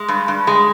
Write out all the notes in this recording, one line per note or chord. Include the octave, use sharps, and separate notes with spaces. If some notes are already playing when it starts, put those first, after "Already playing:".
Already playing: G#3
G2
G2
G#3